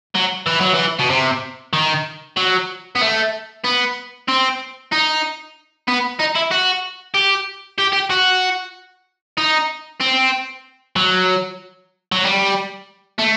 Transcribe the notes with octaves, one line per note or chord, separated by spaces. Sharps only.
F#3
E3
F#3
E3
B2
C3
D#3
F#3
B3
A3
B3
C4
D#4
B3
D#4
E4
F#4
G4
G4
G4
F#4
D#4
C4
F#3
F#3
G3
A3